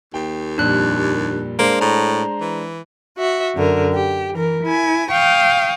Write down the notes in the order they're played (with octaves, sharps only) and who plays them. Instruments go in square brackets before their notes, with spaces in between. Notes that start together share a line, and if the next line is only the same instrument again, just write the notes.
[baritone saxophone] D#2 [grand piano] G5
[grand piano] F2 A#2 G3 [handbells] D4 F#6
[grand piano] G#3 D4 C5 [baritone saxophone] A#3
[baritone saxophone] A2 [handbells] A#5
[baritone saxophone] E3
[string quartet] F#4 E5
F#2 D3 A#4
G4
E3 A#4
E4 G#5
F5 G5 C#6 D#6